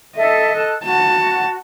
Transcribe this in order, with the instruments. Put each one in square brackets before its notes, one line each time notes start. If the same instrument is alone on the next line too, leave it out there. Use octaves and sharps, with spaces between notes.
[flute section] A4 E5 [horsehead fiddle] D#5
[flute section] A4 A5 F#6
[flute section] F#4 [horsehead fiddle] A5